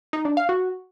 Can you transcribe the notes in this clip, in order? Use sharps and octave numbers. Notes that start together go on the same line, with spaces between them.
D#4
D4
F5
F#4